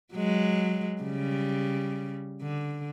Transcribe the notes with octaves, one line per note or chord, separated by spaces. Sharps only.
F#3 G#3
C#3 G3
D3